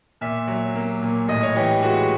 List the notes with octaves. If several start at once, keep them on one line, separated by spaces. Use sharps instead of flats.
A#2 E5
F#3
A#3
A#2
A2 D#5
C#5
E3 G4
G#3 F#4